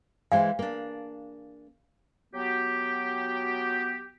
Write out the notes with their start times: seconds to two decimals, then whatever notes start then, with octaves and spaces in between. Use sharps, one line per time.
0.32 E3 G#3 C5 F5
0.59 A#3 D4
2.34 F#3 B3 F#4 G4